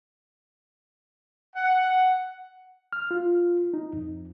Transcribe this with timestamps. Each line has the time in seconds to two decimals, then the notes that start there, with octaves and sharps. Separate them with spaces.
1.56 F#5
2.93 F6
3.11 F4
3.74 D#4
3.93 F2